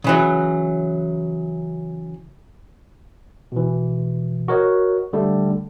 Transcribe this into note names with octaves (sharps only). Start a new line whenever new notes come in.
C#3 E3 F#3
B2 E3
F#4 A#4 C#5 D#5
D3 G3 A3